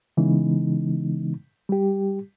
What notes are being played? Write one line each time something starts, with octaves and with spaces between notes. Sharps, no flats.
C#3 E3 G#3 B3 D#4
G3 G4